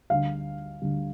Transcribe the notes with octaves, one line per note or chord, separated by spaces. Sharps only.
D2 D3 G3 F5
D2 D3 G3